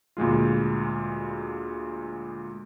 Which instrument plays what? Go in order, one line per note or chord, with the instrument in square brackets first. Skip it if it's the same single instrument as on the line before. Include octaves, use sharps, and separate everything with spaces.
[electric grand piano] D2 A#2 G#3 F4